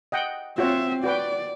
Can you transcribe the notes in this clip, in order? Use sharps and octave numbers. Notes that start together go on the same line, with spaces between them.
D#5 F#5 G5
C4 F4 F#4 C#5 E5
F#4 B4 D5 G5